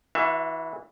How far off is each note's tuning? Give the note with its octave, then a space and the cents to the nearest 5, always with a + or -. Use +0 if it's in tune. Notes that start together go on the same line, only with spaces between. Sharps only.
E3 -20 F#4 -30 E5 +25